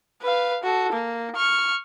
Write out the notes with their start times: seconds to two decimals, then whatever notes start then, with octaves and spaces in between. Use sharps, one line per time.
0.22 B4 F5
0.63 F#4 A4
0.92 A#3
1.35 C#6 F6